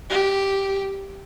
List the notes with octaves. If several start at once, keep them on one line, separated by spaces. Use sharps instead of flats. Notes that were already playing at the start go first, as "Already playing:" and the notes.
G4